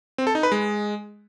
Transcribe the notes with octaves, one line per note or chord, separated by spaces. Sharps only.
C4
A4
D#4
B4
G#3